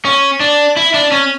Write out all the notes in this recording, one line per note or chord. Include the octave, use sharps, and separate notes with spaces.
C#4
D4
E4
D4
C#4